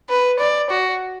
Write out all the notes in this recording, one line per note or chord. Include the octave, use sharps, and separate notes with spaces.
B4
D5
F#4